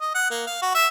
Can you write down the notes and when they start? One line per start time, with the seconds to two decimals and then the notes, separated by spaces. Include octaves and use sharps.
0.01 D#5
0.15 F#5
0.31 A#3
0.47 F5
0.62 F#4
0.74 E5